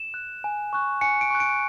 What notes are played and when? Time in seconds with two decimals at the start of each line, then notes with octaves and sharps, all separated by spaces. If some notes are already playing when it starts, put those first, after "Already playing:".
Already playing: E7
0.14 F#6
0.44 G#5
0.73 C#6 F#6
1.01 G#5 C#7
1.21 D7
1.31 C#6 F#6
1.40 D7